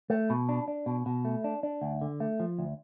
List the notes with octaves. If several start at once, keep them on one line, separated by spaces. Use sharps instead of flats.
A3
B2
D4
D4
B2
B2
A3
D4
D4
D2
D3
A3
F3
D2